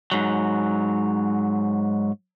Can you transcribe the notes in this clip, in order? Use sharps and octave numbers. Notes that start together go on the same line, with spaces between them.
G#2 F#3